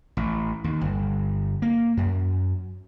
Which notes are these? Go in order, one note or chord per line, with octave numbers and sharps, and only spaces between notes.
A1
D#2
G1
A#3
F#2